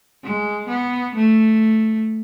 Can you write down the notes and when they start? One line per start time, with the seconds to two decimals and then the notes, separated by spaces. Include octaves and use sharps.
0.23 G#3
0.69 B3
1.15 A3